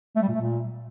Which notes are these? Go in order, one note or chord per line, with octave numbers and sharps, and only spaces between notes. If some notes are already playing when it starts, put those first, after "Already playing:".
A3
G3
A#2
A3
A#2